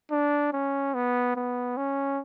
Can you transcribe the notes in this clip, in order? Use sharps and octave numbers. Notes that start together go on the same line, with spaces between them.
D4
C#4
B3
B3
C#4